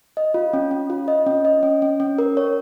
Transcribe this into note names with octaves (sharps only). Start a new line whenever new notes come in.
D#5
F4
C#4
C#4
F4
D#5
C#4
D#5
C#4
C#4
C#4
A#4
C#5